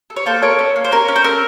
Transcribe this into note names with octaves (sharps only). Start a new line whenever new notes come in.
A4
C#5
A#3 A4 C5
A4 A#4 C#5
C#4
A#3
C5
C#4 A#4
C#4
C5
A4 A#4